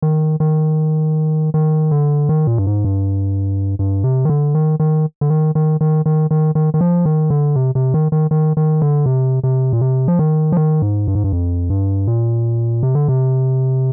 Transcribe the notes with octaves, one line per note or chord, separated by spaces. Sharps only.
D#3
D#3
D#3
D3
D#3
A#2
G2
G#2
G2
G2
C3
D#3
D3
D#3
D#3
D3
D#3
D#3
D#3
D#3
D#3
D#3
D#3
F3
D#3
D3
C3
C3
D#3
D#3
D#3
D#3
D3
C3
C3
A#2
C3
F3
D#3
F3
D#3
G#2
G2
G#2
G2
F2
G2
A#2
C3
D3
C3